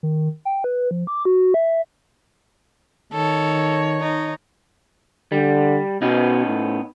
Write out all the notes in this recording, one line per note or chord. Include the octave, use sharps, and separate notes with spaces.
D#3
G5
B4
F3
D6
F#4
E5
D#3 A4 C#5
D#4
D3 G3
B2 B3 C#4 D#4
A2